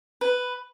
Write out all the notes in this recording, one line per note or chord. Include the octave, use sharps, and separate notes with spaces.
B4